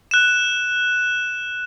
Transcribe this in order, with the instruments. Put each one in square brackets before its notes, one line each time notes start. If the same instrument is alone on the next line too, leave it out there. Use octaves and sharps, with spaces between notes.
[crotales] F#6 E7